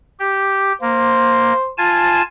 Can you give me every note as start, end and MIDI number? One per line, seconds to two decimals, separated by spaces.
0.19 0.72 67
0.81 1.53 58
0.81 1.72 72
1.78 2.22 65
1.78 2.22 80
1.78 2.22 81